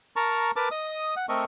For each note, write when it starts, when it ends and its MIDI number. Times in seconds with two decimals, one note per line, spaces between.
0.16 0.51 70
0.16 0.51 81
0.16 0.51 82
0.16 0.51 85
0.56 0.69 70
0.56 0.69 71
0.56 0.69 81
0.56 0.69 86
0.71 1.15 75
0.71 1.15 87
1.16 1.26 78
1.29 1.45 57
1.29 1.45 60
1.29 1.45 69
1.29 1.45 70
1.29 1.45 75
1.29 1.45 85